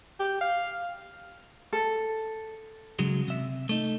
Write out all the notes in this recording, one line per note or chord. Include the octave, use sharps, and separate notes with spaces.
G4
F5
A4
C#3 F#3 G#3
C3 E5
A3 D#4